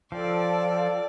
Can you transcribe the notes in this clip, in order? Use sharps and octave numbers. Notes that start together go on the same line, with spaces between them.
F3 A4 D5 G5